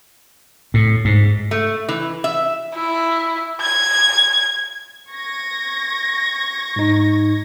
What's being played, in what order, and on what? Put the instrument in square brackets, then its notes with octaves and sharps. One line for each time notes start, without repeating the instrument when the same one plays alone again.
[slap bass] A2
G#2
[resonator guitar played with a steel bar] A3
E3
E5
[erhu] E4
G#6
[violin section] C#6 G#6 A#6
[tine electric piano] G#2 D#4